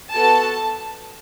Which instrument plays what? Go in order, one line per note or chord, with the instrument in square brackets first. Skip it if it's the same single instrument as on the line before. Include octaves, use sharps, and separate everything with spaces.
[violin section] B3 F#4 A4 A5